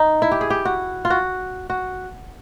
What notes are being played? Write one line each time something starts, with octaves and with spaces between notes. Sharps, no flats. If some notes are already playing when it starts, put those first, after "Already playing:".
Already playing: D#4
E4
G4
G#4
G4
F#4
F4
F#4
F#4